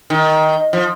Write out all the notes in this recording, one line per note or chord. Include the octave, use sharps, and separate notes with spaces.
D#3
F3